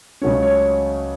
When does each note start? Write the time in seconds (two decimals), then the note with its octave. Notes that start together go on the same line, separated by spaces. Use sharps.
0.22 C#2 C#3 F#3 A3 C#4 C#5
0.42 C#5